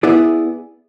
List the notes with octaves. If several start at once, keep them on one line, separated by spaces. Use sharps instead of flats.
B3 E4 G#4 D5